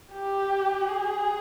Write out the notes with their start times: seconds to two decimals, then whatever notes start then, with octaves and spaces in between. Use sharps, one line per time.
0.13 G4
0.88 G#4